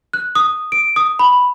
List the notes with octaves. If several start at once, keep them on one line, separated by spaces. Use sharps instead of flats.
F#6
D#6
D7
D#6
B5